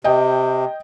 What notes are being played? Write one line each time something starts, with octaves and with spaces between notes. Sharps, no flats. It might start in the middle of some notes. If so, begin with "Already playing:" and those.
C3 D#5 G5